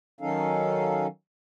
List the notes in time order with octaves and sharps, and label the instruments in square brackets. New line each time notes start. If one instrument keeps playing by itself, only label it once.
[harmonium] D#3 F#3 C#4 D#4 A4 F5